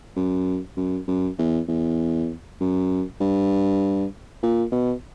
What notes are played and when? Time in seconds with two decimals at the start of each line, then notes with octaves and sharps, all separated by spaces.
0.16 F#2
0.77 F#2
1.08 F#2
1.39 E2
1.68 E2
2.61 F#2
3.21 G2
4.43 A#2
4.72 B2